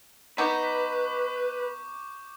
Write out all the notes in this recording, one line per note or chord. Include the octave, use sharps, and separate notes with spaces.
B3 D#4 B4 C#6 D6 G6